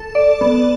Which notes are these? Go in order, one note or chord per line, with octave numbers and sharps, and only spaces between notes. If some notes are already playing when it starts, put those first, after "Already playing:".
Already playing: A4
D5
B3